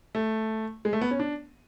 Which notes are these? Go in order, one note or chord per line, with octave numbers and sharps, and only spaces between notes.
A3
G#3
A3
B3
C#4
D4